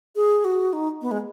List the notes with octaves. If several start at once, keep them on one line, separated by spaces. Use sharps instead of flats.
G#4
F#4
D#4
B3
G#3